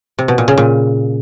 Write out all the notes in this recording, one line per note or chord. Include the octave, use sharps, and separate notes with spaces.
C3
B2
A#2
C#3
A#2